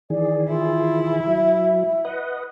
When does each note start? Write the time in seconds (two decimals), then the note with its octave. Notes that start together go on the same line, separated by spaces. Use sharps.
0.10 D#3 E3 G#4 D5
0.48 E4 F4
1.27 F#3 E5
2.05 B4 D#5 F#5